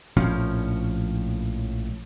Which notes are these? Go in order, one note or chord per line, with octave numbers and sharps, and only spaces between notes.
A#1 A2 F3 C#4